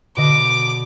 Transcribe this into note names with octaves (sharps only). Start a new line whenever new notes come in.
B2 D3 D#5 D6